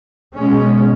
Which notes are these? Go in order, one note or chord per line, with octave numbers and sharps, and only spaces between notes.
B2 G#3 C#4